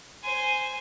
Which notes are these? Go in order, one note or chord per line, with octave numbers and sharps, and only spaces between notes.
C5 G#5